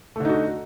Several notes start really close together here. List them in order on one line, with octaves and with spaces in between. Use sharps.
A3 D3 D#4 F#4